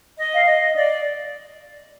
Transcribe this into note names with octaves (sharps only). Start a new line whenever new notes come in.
D#5
F5
D#5
D5